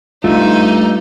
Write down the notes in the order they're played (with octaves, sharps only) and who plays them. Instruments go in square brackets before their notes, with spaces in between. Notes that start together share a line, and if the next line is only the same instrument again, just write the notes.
[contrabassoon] G2 [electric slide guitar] A3 [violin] D#4 [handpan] F4